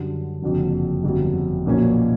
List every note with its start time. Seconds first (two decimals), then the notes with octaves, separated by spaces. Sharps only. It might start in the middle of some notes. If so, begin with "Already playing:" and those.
Already playing: F#2 D3 G3
0.42 F#1 F2 D3 F#3
1.04 G1 F2 D3 F#3
1.66 B1 A#2 F3 A#3 C#4